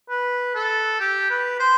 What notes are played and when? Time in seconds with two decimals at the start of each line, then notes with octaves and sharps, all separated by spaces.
0.10 B4
0.55 A4
1.00 G4
1.30 B4
1.60 C5